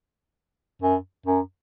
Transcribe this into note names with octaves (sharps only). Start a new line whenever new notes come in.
F#2
F#2